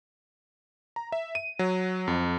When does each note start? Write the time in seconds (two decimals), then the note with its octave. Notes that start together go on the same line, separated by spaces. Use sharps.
0.96 A#5
1.12 E5
1.35 D#7
1.59 F#3
2.08 F2